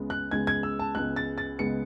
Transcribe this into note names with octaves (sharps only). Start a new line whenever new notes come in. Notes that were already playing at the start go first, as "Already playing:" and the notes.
Already playing: C#2 C#3 G#3 B3
F#6
C#2 C#3 G#3 B3 G#6
G#6
E6
A5
C#2 C#3 G#3 B3 F#6
A6
A6
C#2 C#3 G#3 B3 C#7